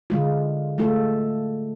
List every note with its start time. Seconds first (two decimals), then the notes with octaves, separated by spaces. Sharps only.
0.10 D3 G#3 F4
0.78 G#3 A3 F4 A4